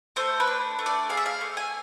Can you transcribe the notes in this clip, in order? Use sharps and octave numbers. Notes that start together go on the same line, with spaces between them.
A3 C5
B4
D4
A3
D5
G#4 F5
E5
F5
A3
G#5